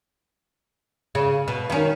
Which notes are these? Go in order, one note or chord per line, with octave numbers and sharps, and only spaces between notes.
C#3
B2
D#3 C#4